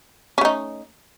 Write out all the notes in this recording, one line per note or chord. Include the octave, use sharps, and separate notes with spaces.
A3 C#4 D#4